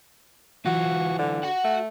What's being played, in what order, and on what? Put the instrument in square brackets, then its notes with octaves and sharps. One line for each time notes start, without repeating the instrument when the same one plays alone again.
[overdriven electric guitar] E3 F4 [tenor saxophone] F#4
[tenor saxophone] D3
[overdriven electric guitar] F#4 F#5
[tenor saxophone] A3